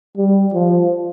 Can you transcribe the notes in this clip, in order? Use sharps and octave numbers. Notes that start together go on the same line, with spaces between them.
G3
F3